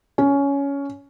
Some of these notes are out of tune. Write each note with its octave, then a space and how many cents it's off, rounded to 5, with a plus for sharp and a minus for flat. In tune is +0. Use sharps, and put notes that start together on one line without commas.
C#4 +15